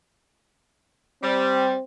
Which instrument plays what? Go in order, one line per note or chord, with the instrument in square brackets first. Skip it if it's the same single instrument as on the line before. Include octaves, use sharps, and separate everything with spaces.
[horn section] G3 [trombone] C4